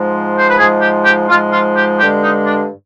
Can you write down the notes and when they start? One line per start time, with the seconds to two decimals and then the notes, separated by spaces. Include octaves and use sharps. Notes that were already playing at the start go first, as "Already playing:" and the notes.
Already playing: G#2 F3 G#3
0.39 C5
0.49 B4
0.58 G#2 F3 G#3 G#4
0.82 G4
1.05 G4
1.29 G#2 F3 G#3 F4
1.52 F4
1.77 G4
2.00 G2 D3 G#3 G4
2.23 D#4
2.47 D4